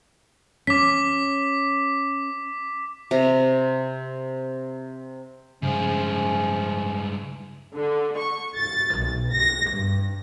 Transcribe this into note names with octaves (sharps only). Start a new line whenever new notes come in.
C#4 D6 B6
C3 A#5
G2 C#3 F3 G#3 A3 C#4
D3
C#6
A6
B1
A#6
G2